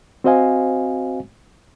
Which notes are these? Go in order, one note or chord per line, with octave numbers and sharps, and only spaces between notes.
C4 F#4 C5 D#5 F5 G#5